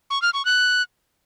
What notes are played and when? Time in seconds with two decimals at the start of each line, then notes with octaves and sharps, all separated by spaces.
0.10 C#6
0.22 F6
0.34 C#6
0.45 F#6